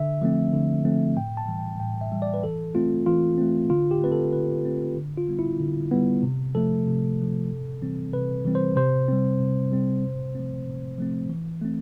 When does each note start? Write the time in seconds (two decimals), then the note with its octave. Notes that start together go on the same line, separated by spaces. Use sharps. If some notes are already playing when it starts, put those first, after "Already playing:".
Already playing: D3 E5
0.22 F3 A3 C4
0.53 D3
0.85 F3 A3 C4
1.16 A2 G5
1.37 A5
1.48 E3 G3
1.58 G5
1.80 A2 G5
2.01 E5
2.12 E3 G3
2.22 D5
2.34 B4
2.43 E3 A4
2.75 A3 C4 F4
3.06 E3 F4
3.38 A3 C4
3.70 D3 F4
3.91 G4
4.01 A3 C4 B4
4.12 A4
4.33 D3 B4
4.65 A3 C4
4.96 D3
5.18 F4
5.28 G3 B3
5.39 E4
5.60 D3
5.91 G3 B3
6.23 C3
6.55 F3 A3 A4
6.86 C3
7.19 F3 A3
7.50 C3
7.82 E3 G3 C4
8.13 C3 B4
8.45 E3 G3 C4
8.55 C5
8.76 C3 C5
9.08 G3 C4
9.40 C3
9.72 G3 C4
10.03 C3
10.35 F3 A3 C4
10.66 C3
10.98 F3 A3 C4
11.30 E3
11.61 A3 C4